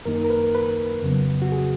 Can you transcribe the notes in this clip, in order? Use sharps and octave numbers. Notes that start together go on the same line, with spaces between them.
F#2 D#3 A#3 D#4 A#4
A#4
B4
B4
F2 C#3 F#3 B3
F#4
G#4